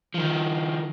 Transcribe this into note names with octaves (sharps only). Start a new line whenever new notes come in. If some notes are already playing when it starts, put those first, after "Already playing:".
D#3 F3